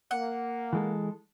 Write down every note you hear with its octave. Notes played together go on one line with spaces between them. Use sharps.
A#3 F#5
E3 G#3 A4